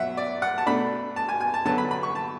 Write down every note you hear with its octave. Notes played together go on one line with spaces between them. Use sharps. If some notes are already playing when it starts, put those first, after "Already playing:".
Already playing: B2 F#3 E5 F#5
D5
F#5
A5
B2 A3 D4 B5
A5
G#5
G#5
A5
D3 F#3 B3 A5
B5
B5
C#6
A5